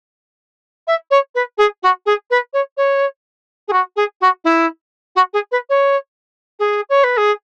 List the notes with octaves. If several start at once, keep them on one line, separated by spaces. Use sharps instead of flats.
E5
C#5
B4
G#4
F#4
G#4
B4
C#5
C#5
G#4
F#4
G#4
F#4
E4
F#4
G#4
B4
C#5
G#4
C#5
B4
G#4